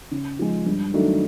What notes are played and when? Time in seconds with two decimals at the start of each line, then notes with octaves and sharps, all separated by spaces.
0.11 C#3
0.39 F3 G#3
0.66 G2
0.94 D#3 F#3 A3 D4